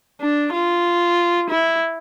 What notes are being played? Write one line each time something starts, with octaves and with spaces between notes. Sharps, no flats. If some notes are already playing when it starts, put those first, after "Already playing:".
D4
F4
E4